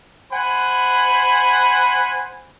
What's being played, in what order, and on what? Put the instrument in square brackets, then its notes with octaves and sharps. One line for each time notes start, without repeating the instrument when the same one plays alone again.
[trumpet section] C5 F#5 G#5 B5